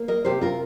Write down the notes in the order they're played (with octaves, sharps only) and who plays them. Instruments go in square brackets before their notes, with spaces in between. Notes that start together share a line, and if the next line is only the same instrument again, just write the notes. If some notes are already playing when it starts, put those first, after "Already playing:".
Already playing: [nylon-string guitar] A#3
A#4 D#5
C3 G4 C5
F4 A#4